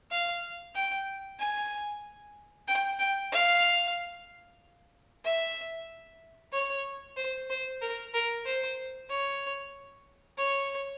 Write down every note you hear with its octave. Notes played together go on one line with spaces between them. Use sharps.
F5
G5
G#5
G5
G5
F5
E5
C#5
C5
C5
A#4
A#4
C5
C#5
C#5